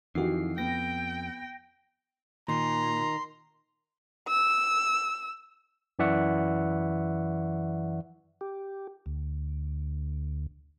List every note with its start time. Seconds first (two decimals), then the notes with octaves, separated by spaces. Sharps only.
0.15 F2 D#3 E3 F#4 G4 C7
0.58 B3 G5 A#6
2.48 A#2 D#3 A#5 C6
4.28 E6
5.99 F#2 E3 D5 E5 F#5 C#6
8.41 G4
9.06 D2